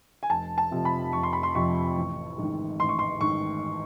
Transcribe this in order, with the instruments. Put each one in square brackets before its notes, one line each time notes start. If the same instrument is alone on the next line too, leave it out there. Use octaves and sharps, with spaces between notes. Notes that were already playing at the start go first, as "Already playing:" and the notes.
[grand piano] G#5
F1 A5
A5
F2 C3 F3
B5
F1 C#6
C6
B5
C6
F2 C3 F3 C#6
A1
G#2 D#3
A1 C6
C#6
C6
G#2 D#3 C#6